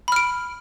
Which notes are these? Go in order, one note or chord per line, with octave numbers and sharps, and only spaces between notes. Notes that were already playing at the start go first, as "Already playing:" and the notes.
B5 F6 D7